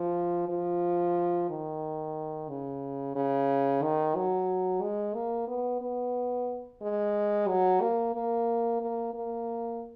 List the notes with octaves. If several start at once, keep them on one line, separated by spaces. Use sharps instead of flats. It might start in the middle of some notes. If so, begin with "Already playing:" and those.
Already playing: F3
F3
D#3
C#3
C#3
D#3
F#3
G#3
A#3
B3
B3
G#3
F#3
A#3
A#3
A#3
A#3